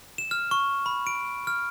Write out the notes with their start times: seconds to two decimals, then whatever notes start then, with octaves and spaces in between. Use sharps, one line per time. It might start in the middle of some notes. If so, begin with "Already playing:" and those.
0.18 E7
0.31 F6
0.51 C#6
0.86 B5
1.07 D7
1.47 F6